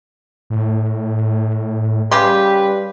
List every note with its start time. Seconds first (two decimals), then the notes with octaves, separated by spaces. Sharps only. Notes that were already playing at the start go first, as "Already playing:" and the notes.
0.50 A2
2.11 C#3 G3 G4 B4 C6